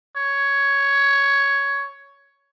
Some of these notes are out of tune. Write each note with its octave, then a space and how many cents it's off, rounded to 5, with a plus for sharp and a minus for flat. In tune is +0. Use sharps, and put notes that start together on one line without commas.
C#5 +10